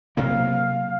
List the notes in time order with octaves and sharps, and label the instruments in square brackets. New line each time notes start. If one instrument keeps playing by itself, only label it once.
[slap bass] C3 F#3 A#3 [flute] F5